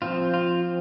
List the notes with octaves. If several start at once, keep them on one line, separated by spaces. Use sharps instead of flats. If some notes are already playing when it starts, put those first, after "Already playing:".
F3 C4 F4
F4